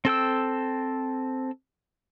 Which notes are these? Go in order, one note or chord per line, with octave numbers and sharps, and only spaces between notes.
C4 A4 G5 E6